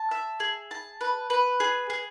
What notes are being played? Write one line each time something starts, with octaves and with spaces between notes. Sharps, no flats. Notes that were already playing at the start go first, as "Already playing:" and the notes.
Already playing: A5
E5
G#4
A5
B4
B4
G#4
G#4